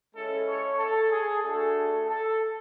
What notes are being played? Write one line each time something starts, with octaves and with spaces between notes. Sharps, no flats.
G#3 C#4 E4 A4
C#5
A4
G#4
A3 D4 F#4 A4
A4